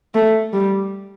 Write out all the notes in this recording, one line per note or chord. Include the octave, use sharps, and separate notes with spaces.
A3
G3